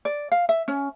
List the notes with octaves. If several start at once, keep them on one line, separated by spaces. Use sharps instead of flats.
D5
F5
E5
C#4